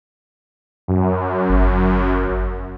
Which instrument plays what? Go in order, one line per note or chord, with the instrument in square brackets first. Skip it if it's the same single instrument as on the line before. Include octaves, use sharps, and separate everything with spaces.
[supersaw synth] F#2
[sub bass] G1